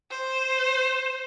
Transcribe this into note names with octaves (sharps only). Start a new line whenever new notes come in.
C5